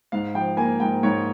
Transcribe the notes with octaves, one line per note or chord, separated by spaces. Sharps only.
G#2 F5
F3 G5
A#3 G#5
G#2 G5
G#2 C#5